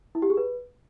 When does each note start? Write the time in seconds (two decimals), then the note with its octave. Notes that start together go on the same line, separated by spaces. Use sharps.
0.15 E4
0.22 G4
0.30 G#4
0.37 B4